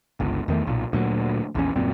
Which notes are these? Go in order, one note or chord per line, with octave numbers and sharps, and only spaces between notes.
G1 C#2
E2 D#3 A3
B1 A#2
D2 A#2 F#3
A#1 E2 C#4
D#1 F#2 A#2 C4